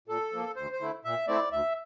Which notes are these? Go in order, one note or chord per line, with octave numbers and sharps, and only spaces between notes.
A#2 A4
F3 A#3
D2 C5
C5
D3 A3 E4
A#2 E5
A3 C4 E4 D5
D2 E5